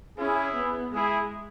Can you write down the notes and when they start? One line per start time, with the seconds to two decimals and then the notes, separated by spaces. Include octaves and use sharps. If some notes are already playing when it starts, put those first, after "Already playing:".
0.18 C#4 E4 G#4
0.56 B3
0.93 G#3 E4 G#4